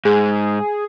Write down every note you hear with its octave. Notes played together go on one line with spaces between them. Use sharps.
G#2 G#4